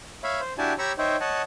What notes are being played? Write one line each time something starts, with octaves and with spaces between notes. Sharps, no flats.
C#5 E5 F5 B5
C5
D4 E4 F#4 G4 G#5 A5
G4 C#5 A#5 B5 C#6 E6
D#4 C5 C#5 E5 G5
C#5 D#5 F#5 A5